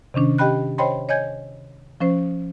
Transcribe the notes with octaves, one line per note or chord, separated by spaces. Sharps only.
C3 D#3 C#4 D4
G4 D#5 G5 B5 F#6
C5 C#5 D#5 G5 B5 C6
C#5 D#5 G#5 G6 G#6
F3 C#4 C5